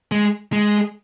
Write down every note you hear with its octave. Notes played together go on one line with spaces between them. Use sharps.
G#3
G#3